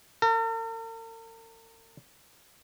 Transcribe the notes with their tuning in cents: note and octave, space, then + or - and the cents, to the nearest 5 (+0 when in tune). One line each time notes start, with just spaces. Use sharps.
A#4 -45